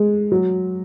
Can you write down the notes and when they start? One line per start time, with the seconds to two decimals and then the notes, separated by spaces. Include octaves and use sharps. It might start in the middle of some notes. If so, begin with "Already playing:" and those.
Already playing: G#3
0.32 F#3